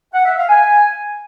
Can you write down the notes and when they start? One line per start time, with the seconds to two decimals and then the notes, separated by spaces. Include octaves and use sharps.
0.13 F#5
0.25 E5
0.37 F5
0.48 G#5